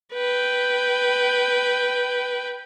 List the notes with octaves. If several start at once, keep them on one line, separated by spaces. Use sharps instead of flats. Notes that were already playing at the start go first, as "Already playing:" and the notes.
B4 G5